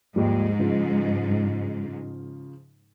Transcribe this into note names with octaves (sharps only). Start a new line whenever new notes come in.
D#2 G#2 F3 G3
C#3 F3